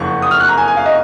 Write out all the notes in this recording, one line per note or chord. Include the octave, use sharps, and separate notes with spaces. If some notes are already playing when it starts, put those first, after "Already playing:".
Already playing: F#1 F2 F3 F#5 C#6
D#6
F6
F#6
A#5
G#5
G#5
F5
D#5